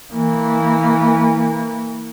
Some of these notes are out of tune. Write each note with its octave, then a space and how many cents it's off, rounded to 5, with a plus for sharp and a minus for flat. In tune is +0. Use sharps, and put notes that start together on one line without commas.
E3 -25 A#3 -20